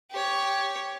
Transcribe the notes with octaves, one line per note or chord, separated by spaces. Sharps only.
G4 C#5